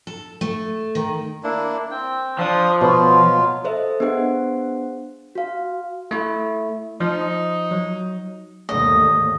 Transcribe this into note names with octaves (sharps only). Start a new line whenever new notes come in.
A4
A3
D#3
A#3 D4 E4
C4 G5
F3 D4 D#6
B2 F#3 F4
A4 C5 D#5 E5
B3 D4 G#4 C5 F#5
F#4 F5
A3 E4
F3 D#4
F#3
D#2 G#2 D3 A3 D#5